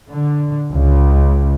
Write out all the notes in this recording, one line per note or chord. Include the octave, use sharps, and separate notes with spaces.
D3
C#2